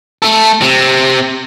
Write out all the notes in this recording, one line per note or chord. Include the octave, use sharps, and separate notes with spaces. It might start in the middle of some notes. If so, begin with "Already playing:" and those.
A3 A4
C3